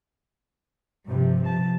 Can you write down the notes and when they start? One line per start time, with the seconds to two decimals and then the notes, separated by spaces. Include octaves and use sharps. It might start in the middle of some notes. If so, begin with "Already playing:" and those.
1.07 G2 C3 F3
1.44 F3 A5